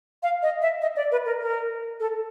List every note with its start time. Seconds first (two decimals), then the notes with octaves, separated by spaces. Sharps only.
0.23 F5
0.42 D#5
0.62 E5
0.82 D#5
0.96 D5
1.12 B4
1.26 A#4
1.41 A#4
2.00 A4